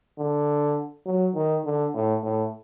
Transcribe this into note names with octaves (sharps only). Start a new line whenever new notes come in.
D3
F#3
D#3
D3
A2
A2